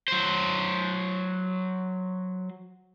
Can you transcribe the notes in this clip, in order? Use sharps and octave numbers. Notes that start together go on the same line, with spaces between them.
F#3 C5